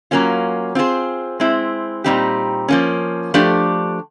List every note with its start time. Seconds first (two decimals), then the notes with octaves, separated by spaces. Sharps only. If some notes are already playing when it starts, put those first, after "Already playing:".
0.11 F#3 A#3 C#4 F4
0.75 C4 F4 G#4 C5
1.40 G#3 C4 E4
2.04 A#2 G3 C4 D#4 G4
2.68 F3 A#3 C#4
3.34 F3 A3 D4 G4